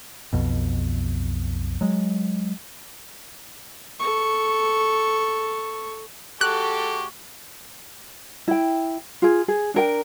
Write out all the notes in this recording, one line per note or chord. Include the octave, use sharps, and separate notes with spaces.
B1 F2 B2
F#3 G#3
A4 C#6
G#3 F#4 G4 A4 C#6 F#6
E4 G5
F4 G#4
G#4
D4 A#4 G5